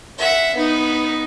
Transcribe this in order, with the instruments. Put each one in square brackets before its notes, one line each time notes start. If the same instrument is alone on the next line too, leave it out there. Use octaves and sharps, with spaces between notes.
[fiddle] E5 F#5
B3 D#4